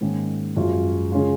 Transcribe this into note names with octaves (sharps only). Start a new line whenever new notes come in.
G#2 D#3 A#3 C#4
F#2 F3 G#3 C#4 F4
C#3 G#3 C#4 F4